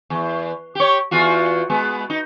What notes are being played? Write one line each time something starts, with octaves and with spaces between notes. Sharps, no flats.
E2
G4 C#5
E2 F4 F#4
G#3 B3
D#4